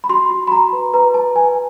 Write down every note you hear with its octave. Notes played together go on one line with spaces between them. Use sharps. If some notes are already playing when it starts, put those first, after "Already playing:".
B5
F#4 C6
F#4
B5
F#4 A#5
B4
B4 A#5
B4 A5
B4 G#5